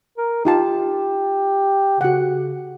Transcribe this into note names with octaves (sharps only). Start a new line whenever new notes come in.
A#4
D#4 F4 G4 A5
C#3 F#4 F#5